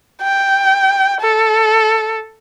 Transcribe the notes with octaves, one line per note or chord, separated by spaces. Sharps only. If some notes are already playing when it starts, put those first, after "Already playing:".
G5
A4